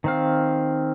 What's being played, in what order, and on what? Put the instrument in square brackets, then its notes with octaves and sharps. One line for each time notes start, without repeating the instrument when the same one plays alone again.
[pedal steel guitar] D#3 C4 F5